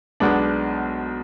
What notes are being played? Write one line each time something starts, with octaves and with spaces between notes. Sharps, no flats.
B1 B2 G#3 B3 D4